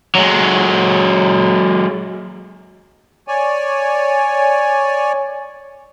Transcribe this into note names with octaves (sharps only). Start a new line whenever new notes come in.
F#3 G#3
C#5 D5 G#5